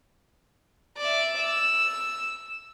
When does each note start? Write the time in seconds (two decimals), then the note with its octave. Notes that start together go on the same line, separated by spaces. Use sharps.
0.97 D5 E5
1.37 E6